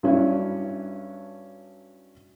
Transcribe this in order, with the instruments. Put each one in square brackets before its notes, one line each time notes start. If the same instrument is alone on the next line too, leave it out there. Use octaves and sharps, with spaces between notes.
[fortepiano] G2 F#3 C#4 D4 E4